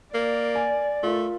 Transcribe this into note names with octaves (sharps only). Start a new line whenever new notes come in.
A#3 D5
G#5
A3 F4 A#4